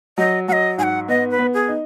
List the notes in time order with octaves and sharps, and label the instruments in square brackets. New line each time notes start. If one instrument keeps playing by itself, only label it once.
[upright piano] F#3 [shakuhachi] D#5
[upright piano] F#3 [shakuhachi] D#5 F#5
[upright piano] G#2 [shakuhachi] G#5
[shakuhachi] F#5
[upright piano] B3 [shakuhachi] D#5
[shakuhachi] B4
[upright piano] B3
[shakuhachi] G#4
[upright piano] D#4